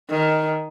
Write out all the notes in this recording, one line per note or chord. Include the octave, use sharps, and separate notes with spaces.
D#3